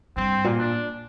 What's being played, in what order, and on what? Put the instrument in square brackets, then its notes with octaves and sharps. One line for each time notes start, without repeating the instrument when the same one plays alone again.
[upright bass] G2 [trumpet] C4
[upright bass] A#2
[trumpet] D4